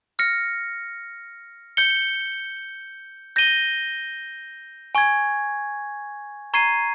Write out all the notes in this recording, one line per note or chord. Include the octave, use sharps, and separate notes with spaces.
F6 A#6 C#7
G6 C#7 G7
G6 A#6 D#7 G7
G#5 C#6 G#6
A#5 C#6 G#6 C7 D#7